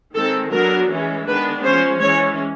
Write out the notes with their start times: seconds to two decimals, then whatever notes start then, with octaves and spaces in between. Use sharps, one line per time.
0.14 D#3 G#3 C4 A4
0.51 F#3 B3 D4 A#4
0.90 E3 G#3 C#4
1.26 D#3 G#3 B3 D4 B4
1.64 F3 G#3 C#4 C5
2.01 E3 G#3 C#4 C#5